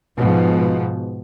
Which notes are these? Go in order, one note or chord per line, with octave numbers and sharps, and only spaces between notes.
G#2 B2 F3